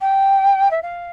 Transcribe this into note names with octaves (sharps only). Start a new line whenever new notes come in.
G5
E5
F5